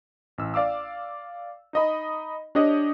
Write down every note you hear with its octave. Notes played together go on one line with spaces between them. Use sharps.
A1 E6
D5 F5 D6 E6
D#4 D#5 B5
D4 G4 C#5 D#5